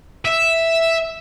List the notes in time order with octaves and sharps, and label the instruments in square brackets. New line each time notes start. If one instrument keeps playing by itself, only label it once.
[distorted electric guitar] E5